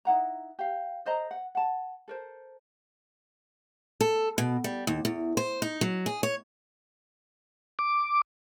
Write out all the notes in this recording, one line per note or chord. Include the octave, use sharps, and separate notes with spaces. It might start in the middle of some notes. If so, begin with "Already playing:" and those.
D#4 E4 F#5 A#5
G4 F5
A4 C5 D#5 A#5
F#5
F#5 A5
A4 A#4 C5
A4
B2
G3
D#2
E2
C5
D#4
F#3
G#4
C#5
D6